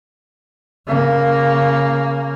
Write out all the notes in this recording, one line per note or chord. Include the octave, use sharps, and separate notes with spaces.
C#3 A#3